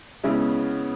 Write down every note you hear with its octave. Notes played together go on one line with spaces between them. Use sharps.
C#3 G#3 B3 C#4 E4